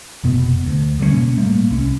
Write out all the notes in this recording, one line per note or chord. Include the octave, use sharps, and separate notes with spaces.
F1 B2 B3
D2
D3 G3 G#3 C#4
B2 A#3 C#4
A2 G3 A3 A#3
C2 C#4